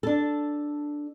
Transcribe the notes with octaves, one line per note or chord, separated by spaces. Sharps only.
D4 A4